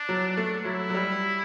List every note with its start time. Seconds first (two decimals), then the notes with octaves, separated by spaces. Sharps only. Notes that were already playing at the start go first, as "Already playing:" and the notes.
Already playing: D4
0.09 F#3
0.37 A3
0.65 F#3 E4
0.90 F#3
0.94 G3